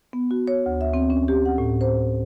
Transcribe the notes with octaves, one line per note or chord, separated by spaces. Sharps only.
B3
F#4
C#5
D2
E5
C4
C#4
G4
F#5
A2
C5